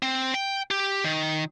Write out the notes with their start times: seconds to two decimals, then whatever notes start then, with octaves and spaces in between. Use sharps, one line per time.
0.03 C4
0.34 G5
0.71 G4
1.04 D#3